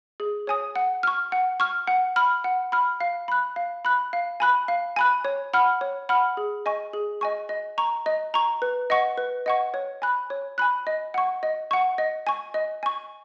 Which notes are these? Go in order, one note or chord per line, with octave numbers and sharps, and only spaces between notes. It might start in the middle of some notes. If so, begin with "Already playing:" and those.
G#4
C#5 G#5 D#6
F#5
C#6 F6
F#5
C#6 F6
F#5
B5 F6
F#5
B5 F6
F5
B5 F#6
F5
B5 F#6
F5
G#5 B5 F#6
F5
G#5 B5 F#6
C#5
F#5 B5 F6
C#5
F#5 B5 F6
G#4
D#5 G#5 C#6
G#4
D#5 G#5 C#6
D#5
A#5 C#6
D#5
A#5 C#6
B4
D#5 F#5 C#6
B4
D#5 F#5 C#6
C#5
G#5 B5 F#6
C#5
G#5 B5 F#6
D#5
F#5 C#6
D#5
F#5 C#6
D#5
G#5 C#6
D#5
G#5 C#6